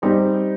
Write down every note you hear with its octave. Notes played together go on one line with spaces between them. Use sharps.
G3 C4 D#4 G4 C5